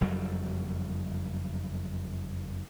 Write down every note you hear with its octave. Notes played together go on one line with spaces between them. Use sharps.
F#1 F2 F#3 G3